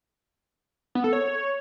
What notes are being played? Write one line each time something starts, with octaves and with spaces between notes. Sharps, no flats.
B3
A4
C#5